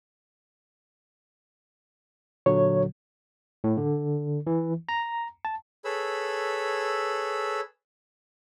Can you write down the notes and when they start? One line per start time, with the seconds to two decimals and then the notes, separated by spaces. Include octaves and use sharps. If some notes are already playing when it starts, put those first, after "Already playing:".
2.46 A#2 D3 F#3 C#5
3.64 A2
3.77 D3
4.47 E3
4.89 A#5
5.45 A5
5.85 G#4 A4 B4 C#5 B5 E6